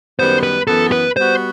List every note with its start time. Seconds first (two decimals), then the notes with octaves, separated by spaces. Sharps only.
0.19 F#2 D#3 G3 B3 C5
0.43 B4
0.67 F#2 E3 B3 A4
0.92 B4
1.15 G3 B3 F#4 C5